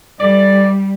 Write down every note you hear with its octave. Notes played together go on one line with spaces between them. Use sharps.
E3 G3 A3 D5